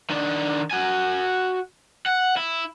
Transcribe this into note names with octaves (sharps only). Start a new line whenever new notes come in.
D#3 D4
F#4 G#5
F#5
E4